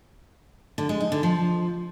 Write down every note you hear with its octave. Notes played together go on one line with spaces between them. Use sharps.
D3
G#3
D#4
D3
F3